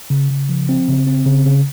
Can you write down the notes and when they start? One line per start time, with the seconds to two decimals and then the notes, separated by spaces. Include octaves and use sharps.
0.10 C#3
0.31 C#3
0.49 F3
0.69 C4
0.88 C#3
1.07 C4
1.26 C#3
1.46 C#3